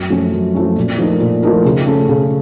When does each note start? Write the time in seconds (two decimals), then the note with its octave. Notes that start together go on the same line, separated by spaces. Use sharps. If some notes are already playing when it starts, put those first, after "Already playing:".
Already playing: F#2
0.10 F3 A3 C#4
0.33 F#2
0.54 F3 A3 C#4
0.77 A#2
0.98 F3 A3 D#4 A#4
1.20 A#2
1.43 F3 A3 D#4 A#4
1.65 C#3
1.86 A3 C#4 A4
2.09 C#3